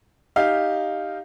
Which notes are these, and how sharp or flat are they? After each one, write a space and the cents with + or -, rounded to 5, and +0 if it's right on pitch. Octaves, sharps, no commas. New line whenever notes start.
D#4 +0 G4 +0 F5 -5